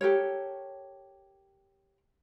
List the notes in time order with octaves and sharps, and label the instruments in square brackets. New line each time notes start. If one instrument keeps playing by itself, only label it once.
[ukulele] G4 A4 A#4 C#5